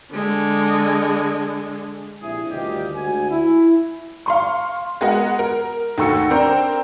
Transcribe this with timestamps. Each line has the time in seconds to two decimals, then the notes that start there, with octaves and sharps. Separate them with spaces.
0.13 D3 G#3
2.21 A#1 C3 E4 G#4
2.50 D2 G2 D#3 F4 G4 D#5
2.95 D2 G#3 F#4 G#5
3.29 E4
4.26 F5 C6 C#6
5.01 G#3 B3 F#4 A#4 D#5 F#5
5.39 A#4
5.98 D#2 A3 F#4 C#6 E6 C#7
6.30 C4 D4 A#4 C5 G5 A#5